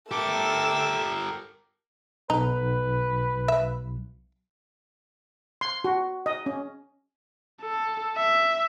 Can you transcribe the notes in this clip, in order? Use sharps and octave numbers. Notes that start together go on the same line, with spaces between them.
A3 G4 A4 A#4 D6 E6
B1 D#4 B4
E5
C6
F#4
D#5
C#4
A4
E5